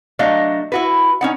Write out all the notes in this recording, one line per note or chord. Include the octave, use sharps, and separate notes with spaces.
F#3 A3 D4 D#5 F5
E4 F#4 B4
C#4 D#4 F#5